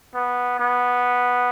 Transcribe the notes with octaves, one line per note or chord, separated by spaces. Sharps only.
B3
B3